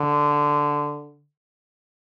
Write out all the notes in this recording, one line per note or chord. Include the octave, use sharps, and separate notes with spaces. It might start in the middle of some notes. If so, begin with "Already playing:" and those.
Already playing: D3